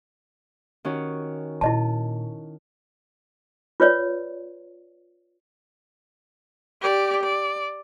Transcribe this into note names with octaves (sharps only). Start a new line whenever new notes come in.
D#3 C#4 F#4
A#2 E4 D#5 A5
F4 B4 C#5 D5
G4 D5
D5